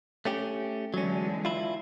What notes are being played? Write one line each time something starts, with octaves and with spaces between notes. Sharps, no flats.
A3 C#4 G4
E2 D3 F#3 G#3 C#4
E4 F4